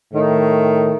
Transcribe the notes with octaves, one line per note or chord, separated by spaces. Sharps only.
A2 D#3